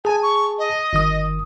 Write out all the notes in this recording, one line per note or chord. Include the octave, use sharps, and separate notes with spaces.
G#4 G#5 A5
C#6
D#5
G1 D#3 D#6